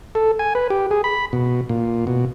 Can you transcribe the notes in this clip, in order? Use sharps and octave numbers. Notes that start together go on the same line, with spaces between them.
A4
G#5
B4
G4
G#4
B5
B2
A#2
B2